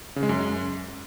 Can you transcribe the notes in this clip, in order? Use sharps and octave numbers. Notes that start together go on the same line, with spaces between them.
C#3
G#3
F#2